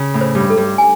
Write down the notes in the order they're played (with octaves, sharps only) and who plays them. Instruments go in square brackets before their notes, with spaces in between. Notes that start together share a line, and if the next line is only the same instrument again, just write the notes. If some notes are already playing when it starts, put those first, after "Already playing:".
Already playing: [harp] C#3
A2
[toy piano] C5
[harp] G2
[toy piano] A4
[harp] G2
[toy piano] G#5